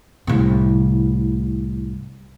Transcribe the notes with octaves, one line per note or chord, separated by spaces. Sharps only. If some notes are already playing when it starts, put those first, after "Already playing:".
C2 A2